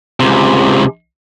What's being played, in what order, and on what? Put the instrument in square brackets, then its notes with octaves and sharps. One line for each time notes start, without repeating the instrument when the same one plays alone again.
[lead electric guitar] C#2 C3